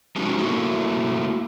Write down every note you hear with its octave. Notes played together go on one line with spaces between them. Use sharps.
G#3 B3 C#4 D#4 F#4 G4
A3 A#3 E4 F#4